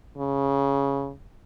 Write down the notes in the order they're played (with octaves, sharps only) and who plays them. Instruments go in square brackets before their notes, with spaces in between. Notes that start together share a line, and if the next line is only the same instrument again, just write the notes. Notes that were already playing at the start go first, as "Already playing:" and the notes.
[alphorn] C#3